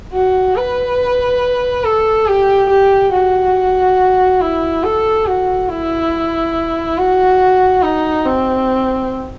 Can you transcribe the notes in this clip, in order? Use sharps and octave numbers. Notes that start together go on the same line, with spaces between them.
F#4
B4
A4
G4
G4
F#4
E4
A4
F#4
E4
F#4
D#4
C4